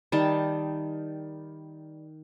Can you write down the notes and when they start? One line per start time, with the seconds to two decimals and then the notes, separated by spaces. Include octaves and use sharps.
0.12 D#3 G3 A5